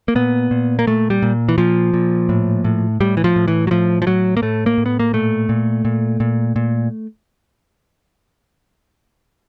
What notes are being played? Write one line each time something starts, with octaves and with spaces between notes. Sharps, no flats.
A#3
A#2 B3
A#2
A#3
A#2 A3
G3
A#2
E3
A#2 F3
A#2
A2
A2
A2 G3
E3
F3
A2
E3
F#3
A2 F3
F3
A2 F#3
A#3
A2 A3
A#3
A2
B3
A#3
A#2 A3
A#2
A#2
A#2
A#2